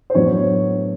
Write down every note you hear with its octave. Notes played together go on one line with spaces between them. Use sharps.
C5
A2 F#3 B3 D4 C#5